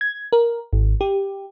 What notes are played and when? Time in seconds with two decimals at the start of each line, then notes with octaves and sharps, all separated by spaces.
0.01 G#6
0.33 A#4
0.73 G#1
1.01 G4